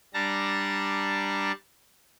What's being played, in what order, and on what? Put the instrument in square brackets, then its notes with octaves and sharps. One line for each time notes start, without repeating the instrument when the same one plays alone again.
[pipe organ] G3 D4 A5 A#5